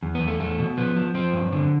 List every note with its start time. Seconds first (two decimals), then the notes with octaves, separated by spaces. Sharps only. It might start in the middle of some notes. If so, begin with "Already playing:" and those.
0.03 E2
0.15 B3
0.21 E2
0.28 A3
0.40 E2 A3
0.59 B2
0.77 F3 B3
0.96 F3
1.15 F3 C4
1.33 G2
1.52 D3